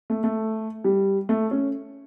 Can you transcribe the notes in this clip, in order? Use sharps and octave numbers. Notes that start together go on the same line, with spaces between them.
A3
A3
G3
A3
C#4